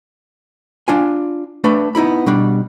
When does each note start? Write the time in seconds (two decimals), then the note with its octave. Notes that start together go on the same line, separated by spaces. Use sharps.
0.88 D4 F4 G#5
1.64 A3 D4 B4
1.95 B3 D#4 E4 B5
2.26 B2 G3 D4